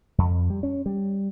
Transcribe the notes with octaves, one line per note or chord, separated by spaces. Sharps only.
F2
G3
C#4
G3